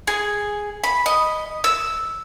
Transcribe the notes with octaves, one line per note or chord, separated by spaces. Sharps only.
G#4
B5
D#5
E6